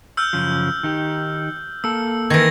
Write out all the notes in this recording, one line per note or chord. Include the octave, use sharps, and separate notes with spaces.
E6 F6 G6
F#2 C#3 F3
D#3 D#4 G4
A#3 A4 E6
D#3 E3 G#6 A#6